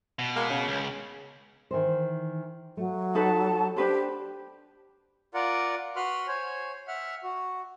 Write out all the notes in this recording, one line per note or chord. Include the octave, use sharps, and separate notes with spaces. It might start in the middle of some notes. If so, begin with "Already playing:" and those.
B2
G#3 A#3
C#3
C#2
D#3 E3 C5
F#3 A3
D#4 A4 B4 A5
D4 G4 B4 C5
F4 A#4 D5 F#5
F#4 B4 B5 C6 F6
C5 C#5 G#5
E5 F#5 F6
F#4